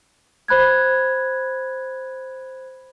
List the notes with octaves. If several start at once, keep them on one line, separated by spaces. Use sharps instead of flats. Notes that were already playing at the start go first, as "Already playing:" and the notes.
C5 B5 F#6 G#6